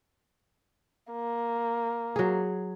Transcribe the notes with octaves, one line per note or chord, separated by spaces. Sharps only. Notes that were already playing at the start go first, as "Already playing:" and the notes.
A#3
F#3 G#4